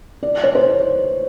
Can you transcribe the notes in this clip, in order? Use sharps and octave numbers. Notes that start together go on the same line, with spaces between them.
D5
C#5
C5